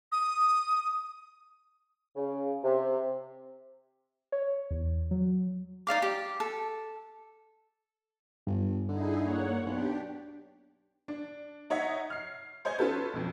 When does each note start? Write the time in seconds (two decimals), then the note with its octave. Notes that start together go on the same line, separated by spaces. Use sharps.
0.12 D#6
2.16 C#3
2.64 C3
4.32 C#5
4.71 E2
5.11 F#3
5.87 D#4 D5 F5 D6
6.02 G4
6.40 A4
8.47 G1 G2
8.89 D3 D#4 E4 G#4
9.22 A#3 C#5 F#5
9.67 B1 D4 G4
11.08 D4
11.70 D#4 C#5 D#5 E5 F#5
12.10 F6 C7
12.65 C5 C#5 D#5 G#5 G6
12.79 C#4 F4 A4 B4
13.14 B1 F2